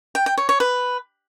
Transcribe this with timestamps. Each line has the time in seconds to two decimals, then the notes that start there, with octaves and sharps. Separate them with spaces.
0.15 G5
0.26 G5
0.38 C#5
0.49 C#5
0.60 B4